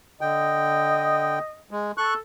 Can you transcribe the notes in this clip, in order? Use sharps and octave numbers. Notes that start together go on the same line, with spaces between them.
D3 D#5 G5
G#3
A4 C#6 F#6